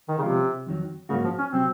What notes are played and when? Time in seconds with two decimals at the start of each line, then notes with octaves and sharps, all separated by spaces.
0.09 D#3
0.18 C#3
0.23 C3 F3 G#3 C#4 F4
0.66 F2 D#3 F#3
1.09 G#2 C#3 F#3 A#3 C#4 F#4
1.24 F3
1.39 C#4
1.52 C3 F#3 C4